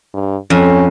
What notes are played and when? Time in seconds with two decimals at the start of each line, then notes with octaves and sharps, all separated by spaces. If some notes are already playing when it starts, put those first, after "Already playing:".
0.14 G2
0.50 F2 C#4